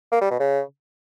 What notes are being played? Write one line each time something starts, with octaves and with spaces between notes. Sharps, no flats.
A#3
G3
B2
C#3